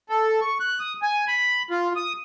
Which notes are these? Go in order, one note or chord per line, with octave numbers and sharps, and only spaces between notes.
A4
C#6
F#6
D#6
G#5
B5
F4
D#6